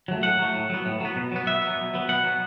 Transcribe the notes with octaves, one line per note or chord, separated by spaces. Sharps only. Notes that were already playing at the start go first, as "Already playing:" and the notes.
F#3 A3
A2 F#5
F#3 A3
A2
F#3 B3
A2
F#3 B3
B2
F#3 B3
B2 E5
B3
F#3
B2
F#3 B3
B2 F#5
F#3 B3